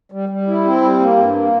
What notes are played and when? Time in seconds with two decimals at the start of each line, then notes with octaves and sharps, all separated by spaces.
0.12 G3
0.29 G3
0.47 E4
0.65 C4
0.82 G3
1.00 A#3
1.17 G2
1.34 A#3